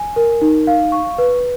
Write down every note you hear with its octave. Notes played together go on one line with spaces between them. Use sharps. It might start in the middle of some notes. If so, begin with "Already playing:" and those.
Already playing: G#5
A#4
D#4
F5
C#6
B4